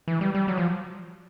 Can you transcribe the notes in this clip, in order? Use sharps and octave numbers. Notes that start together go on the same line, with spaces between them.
E3
G3
G3
F#3
F3